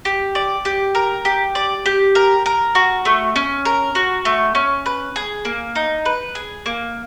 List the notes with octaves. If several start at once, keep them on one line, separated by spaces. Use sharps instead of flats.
G4
D5
G4
A#4
G4
D5
G4
A#4
A#4
F#4
A3
C#4
A#4
F#4
A3
C#4
B4
G#4
A#3
D#4
B4
G#4
A#3